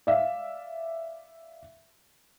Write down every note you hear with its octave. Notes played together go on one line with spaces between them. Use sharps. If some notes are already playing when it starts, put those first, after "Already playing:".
D5 E5 F5